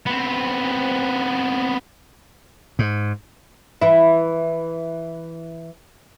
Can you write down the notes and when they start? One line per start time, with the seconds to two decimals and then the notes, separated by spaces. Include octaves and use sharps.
0.06 B3 C4
2.79 G#2
3.82 E3 E4